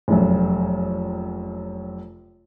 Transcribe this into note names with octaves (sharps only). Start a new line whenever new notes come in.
F1 A#1 F#2